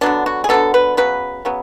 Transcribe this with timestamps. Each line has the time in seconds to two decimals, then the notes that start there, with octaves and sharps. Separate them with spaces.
0.01 D3 F#3 B3 D4
0.26 F#4
0.44 G#4
0.49 D3 F#3 B3 A4
0.74 B4
0.97 C#3 F#3 B3 B4
1.45 C#3 F#3 B3